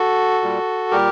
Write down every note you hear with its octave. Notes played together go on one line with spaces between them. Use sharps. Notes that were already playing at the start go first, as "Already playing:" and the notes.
Already playing: F#4 A4
A#2 G3
A#2 G3 G4 A#4